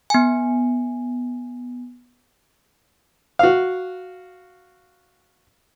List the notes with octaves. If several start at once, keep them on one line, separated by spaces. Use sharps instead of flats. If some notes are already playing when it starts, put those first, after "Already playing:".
B3 G#5
F#4 F5